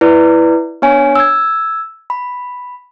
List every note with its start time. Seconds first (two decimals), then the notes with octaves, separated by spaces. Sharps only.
0.01 E4 B4 D5
0.82 B3 D4 C#5 G#5
1.16 E6 G#6
2.10 B5